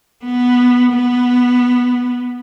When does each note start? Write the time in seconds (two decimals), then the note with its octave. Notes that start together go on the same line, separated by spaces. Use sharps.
0.24 B3
0.93 B3